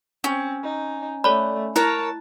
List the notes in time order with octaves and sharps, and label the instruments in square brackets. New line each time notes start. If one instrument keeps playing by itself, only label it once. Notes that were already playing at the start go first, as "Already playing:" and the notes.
[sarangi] C4 [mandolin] C#4
[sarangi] D#4
[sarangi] A3 [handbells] A4 C#5 D5 [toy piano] B5
[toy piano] E4 [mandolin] A#4 C#5 [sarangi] A5 [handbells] F#6